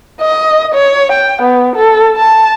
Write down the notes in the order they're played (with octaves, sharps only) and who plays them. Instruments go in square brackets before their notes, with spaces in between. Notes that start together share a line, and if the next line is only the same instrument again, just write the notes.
[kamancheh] D#5
C#5
G5
B3
A4
A5